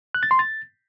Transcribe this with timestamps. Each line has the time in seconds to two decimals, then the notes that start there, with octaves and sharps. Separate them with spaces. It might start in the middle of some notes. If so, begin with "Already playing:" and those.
0.14 F#6
0.23 A6
0.31 C6
0.39 A6